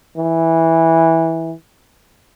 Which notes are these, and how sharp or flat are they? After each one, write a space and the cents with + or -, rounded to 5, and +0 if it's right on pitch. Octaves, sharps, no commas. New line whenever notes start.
E3 -10